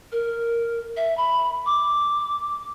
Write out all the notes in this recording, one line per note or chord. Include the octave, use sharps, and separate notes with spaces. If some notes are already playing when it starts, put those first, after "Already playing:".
A#4
E5
B5
D6